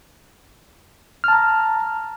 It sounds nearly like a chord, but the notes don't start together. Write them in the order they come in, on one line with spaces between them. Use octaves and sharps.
F6 A5 A#5